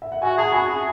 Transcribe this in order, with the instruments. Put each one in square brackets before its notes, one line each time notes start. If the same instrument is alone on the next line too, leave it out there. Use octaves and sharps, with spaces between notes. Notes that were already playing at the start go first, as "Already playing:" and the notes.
[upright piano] E5
F#5
[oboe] F#4 [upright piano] E5 G#5
[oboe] G#4 [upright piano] F#5 A5
[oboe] F#4 [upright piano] G#5 B5
[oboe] G#4